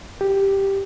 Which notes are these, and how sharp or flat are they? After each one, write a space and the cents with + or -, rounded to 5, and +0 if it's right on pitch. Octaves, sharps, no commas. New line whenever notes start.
G4 +0